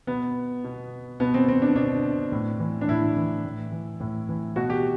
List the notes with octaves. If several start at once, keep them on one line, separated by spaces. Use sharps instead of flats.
B2 B3
B2
B2 B3
C4
C4
D4
B2 D4
A2
E3
D4
A2 E4
E3
A2
E3
A2
E3
B2 F#4
G4